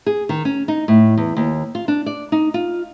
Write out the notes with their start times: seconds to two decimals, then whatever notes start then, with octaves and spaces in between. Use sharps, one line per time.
0.06 G#4
0.29 D#3
0.45 C#4
0.68 D#4
0.88 A2
1.17 E2
1.37 D#2
1.75 F4
1.88 D4
2.06 D5
2.32 D#4
2.54 F4